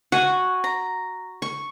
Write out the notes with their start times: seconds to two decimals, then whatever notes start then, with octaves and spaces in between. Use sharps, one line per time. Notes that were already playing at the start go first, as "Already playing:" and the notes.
0.12 F#4 F#5 G#5
0.64 A#5
1.42 C#6